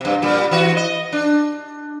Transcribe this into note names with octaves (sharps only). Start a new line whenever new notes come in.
G2 C3
A#2 G3
E3 F#4
D#5
D4